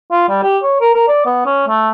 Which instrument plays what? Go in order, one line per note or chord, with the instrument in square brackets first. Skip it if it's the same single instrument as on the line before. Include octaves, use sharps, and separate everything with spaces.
[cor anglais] F4
G3
G4
C#5
A#4
A#4
D5
B3
C#4
A3